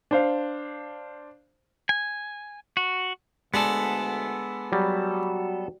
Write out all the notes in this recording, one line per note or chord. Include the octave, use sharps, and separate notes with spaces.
D4 C5 F5
G#5
F#4
D2 G#3 B3 D4 A4
F#3 G3 F#4